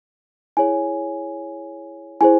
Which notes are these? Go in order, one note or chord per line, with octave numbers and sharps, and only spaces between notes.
E4 G#4 C#5 G#5
E4 G#4 C5 G#5